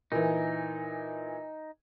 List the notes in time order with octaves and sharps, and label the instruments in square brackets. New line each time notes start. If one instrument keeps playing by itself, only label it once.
[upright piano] A#2 E3 [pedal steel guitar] D#4